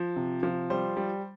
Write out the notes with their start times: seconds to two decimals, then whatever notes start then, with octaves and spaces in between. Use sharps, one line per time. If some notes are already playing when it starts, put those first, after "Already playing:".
Already playing: F3
0.16 C3
0.43 F3
0.70 G3 C5
0.97 G3